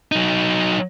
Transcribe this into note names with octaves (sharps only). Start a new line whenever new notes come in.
F#3 D#4